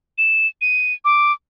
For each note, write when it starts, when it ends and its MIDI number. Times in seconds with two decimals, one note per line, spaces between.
0.18 0.47 100
0.61 0.93 99
1.05 1.32 86